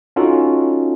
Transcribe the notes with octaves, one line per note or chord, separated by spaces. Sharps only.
C#4 D#4 F4 F#4 A4